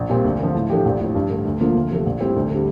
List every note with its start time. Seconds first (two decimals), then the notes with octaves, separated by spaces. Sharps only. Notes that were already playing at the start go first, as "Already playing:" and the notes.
Already playing: A#1
0.10 A#2 G3 C4
0.24 D2
0.39 D3 F3
0.55 A2
0.70 F3 A3 D4 G4
0.85 A#1
1.00 A2 F3
1.15 G2
1.30 D3 A3
1.45 D2
1.60 D3 F3 A#3 F4
1.75 D2
1.90 C3 F3 A3
2.06 A#1
2.20 A2 G3 C4
2.36 D2
2.50 D3 G3